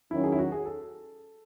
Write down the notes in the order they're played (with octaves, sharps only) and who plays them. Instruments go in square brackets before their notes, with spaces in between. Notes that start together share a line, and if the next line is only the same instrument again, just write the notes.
[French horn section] D#3 F#3 C#4 [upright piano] E4
[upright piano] G#4
E4
F#4
G#4
A4